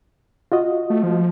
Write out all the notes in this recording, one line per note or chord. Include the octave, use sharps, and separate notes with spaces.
F4 F#4 D#5
A3
F3